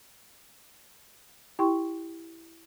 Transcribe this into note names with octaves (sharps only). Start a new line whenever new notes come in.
E4 G4 G5 C6 C#6